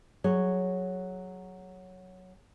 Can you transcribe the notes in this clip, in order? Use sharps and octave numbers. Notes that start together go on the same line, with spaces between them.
F#3 G#4 C#5